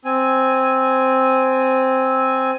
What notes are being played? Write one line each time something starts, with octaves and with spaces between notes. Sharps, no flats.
C4 G#5